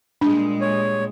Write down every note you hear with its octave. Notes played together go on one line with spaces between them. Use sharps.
A#2 G3 G#3 D4
C#5